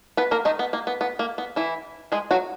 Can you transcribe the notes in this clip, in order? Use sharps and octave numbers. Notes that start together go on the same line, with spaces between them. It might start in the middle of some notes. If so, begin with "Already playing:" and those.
B3 B4
A#3 A#4
D#3 D#4
B3
A#3
B3
B3
A#3
B3
E3 E4
G#3 G#4
F#3 F#4